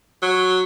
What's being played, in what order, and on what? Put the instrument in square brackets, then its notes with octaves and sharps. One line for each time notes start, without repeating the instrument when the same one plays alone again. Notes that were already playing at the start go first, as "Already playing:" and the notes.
[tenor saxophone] F#3